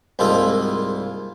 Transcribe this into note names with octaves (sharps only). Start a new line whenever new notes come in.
C2 G#2 A#3 F4 A4 D#5